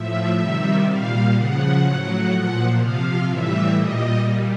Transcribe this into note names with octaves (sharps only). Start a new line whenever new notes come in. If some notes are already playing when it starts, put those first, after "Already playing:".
Already playing: A2 F3 E5
C3 D#3 G3
A#2 G3 F5
C#3 F3 F#5
A2 F#3
A#2 F3
C3 F3 F5
A2 E3 G3 E5
A#2 G3 D#5
A#2 G3